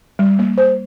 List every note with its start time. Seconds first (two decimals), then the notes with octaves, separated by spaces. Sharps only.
0.19 G3
0.39 A#3
0.58 C5